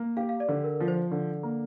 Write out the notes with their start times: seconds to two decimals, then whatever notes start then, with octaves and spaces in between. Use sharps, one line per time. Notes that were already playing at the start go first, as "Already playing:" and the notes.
Already playing: A#3
0.17 G4 F5
0.29 F5
0.40 D5
0.49 D3
0.64 A#4
0.80 F3
0.88 C5
1.12 D3
1.43 A#3